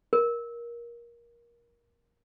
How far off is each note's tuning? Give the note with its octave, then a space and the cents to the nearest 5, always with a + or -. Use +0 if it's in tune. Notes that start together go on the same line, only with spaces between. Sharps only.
A#4 +20